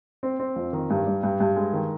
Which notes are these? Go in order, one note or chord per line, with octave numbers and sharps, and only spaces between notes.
C4
C4
F2
D#3
G2
G3
G2
G2
G#3
D#3